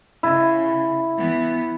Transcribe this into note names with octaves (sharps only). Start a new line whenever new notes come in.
C#3 E4
E3 B3